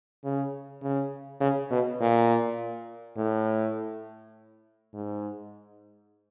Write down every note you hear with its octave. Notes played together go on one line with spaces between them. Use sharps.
C#3
C#3
C#3
B2
A#2
A2
G#2